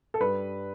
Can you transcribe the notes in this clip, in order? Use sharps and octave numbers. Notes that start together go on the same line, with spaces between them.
A4
G2 B4